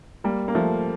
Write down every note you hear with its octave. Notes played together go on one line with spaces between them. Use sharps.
G3 A#3
A#3
F3 A3